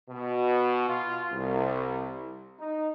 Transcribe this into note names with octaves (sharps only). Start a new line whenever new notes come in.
B2
F4
C2
D#4